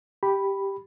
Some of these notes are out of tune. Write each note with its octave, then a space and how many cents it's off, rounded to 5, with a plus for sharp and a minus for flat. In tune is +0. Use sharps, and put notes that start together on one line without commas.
G4 +0 B5 +0